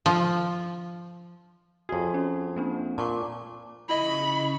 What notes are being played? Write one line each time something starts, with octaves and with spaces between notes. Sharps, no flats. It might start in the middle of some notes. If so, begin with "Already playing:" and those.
F3
F2 F#4 G#4 C#5
C#4
A#3 C4 D4
A#2 A5 C#6 D6
C#3 E4 D#5 B5 C#6